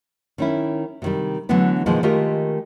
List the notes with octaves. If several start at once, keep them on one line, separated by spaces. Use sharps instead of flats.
D#3 C#4 E4
C3 D#3 G3
D3 E3 F#3 A3 B3 E4
B2 D#3 F3 G#3 A#3
D#3 G#3 A3 F4 G4 A#4